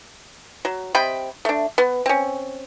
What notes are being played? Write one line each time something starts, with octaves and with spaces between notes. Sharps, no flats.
F#3
C3 D#5 G5 B5
A3 D4
B3
C4 C#4